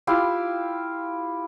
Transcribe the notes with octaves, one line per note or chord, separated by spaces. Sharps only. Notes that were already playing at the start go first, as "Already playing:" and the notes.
E4 F4 G4 F5